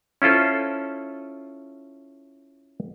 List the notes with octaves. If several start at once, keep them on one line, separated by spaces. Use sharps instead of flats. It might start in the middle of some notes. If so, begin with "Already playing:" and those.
C#4 E4 F4 A4 C5